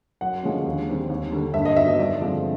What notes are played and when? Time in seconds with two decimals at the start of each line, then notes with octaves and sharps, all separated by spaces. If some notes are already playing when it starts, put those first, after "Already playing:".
0.21 F#2 F#5
0.43 D3 F3 G#3 C#4
0.66 D#2
0.88 D#3 G3 C4
1.10 D#2
1.33 D3 G3
1.54 G2 E5
1.65 D#5
1.76 D#3 F#3 B3 E5
1.88 D#5
1.99 G2 D5
2.21 D3 F3 G#3 C4